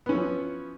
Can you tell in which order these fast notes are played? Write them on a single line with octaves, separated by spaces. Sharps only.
B3 C#4 E4 F3